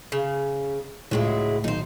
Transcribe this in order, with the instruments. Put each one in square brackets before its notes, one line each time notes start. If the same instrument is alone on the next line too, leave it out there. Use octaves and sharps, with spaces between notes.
[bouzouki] C#3
[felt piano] C#2 A2 [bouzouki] F#3 G#3 E4
[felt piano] B1 D#3 [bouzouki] D#4 C5